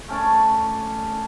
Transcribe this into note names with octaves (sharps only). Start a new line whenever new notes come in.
A3 C#4 D5